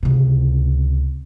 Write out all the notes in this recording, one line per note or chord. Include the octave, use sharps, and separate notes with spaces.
C#2 C3